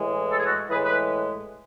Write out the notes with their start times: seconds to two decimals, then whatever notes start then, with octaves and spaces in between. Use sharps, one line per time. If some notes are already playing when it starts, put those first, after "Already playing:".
Already playing: A2 E3 G#3
0.32 A4
0.38 G#4
0.45 F#4 A4
0.69 A2 E3 G#3 G#4 B4
0.83 B4